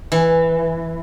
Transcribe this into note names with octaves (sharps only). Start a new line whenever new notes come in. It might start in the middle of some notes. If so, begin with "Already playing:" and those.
E3